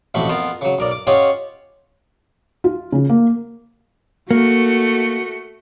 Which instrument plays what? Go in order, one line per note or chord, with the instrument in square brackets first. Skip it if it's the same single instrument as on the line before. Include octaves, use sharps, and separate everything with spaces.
[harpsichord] A1 F2 B2 A3 B5
F2 B3 F4 A#4
C#3 F#3
B1 A#4 D5
D6
C#4 F4 G4 C#5 D#5 F#5
[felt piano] F4
C#3
A#3
[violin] A3 C#7 [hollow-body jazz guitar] A#3 [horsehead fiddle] F#4